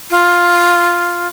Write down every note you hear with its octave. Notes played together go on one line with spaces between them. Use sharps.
F4